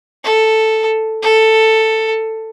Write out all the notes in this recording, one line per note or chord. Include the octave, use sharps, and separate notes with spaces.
A4
A4